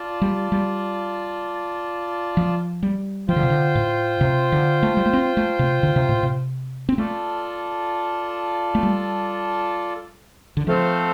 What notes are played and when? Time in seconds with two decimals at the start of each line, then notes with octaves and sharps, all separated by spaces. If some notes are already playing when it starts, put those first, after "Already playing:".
Already playing: F4 D5 A5
0.22 G3
0.52 G3
2.37 F3
2.83 G3
3.28 F3 F4 C5 G5
3.36 D3
3.43 C3
3.50 D3
3.75 A2
4.21 C3
4.52 D3
4.83 A3
4.97 G3
5.06 A3
5.13 C4
5.37 A3
5.59 C3
5.83 D3
5.96 C3
6.09 A2
6.23 C3
6.89 C4
6.98 A3 F4 A4 D5 A5
8.75 A3
8.83 G3
10.57 D3
10.67 F3 A3 C4 A4 C5 F5